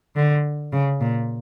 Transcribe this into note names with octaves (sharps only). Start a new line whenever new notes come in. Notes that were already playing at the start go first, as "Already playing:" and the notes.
D3
C#3
A#2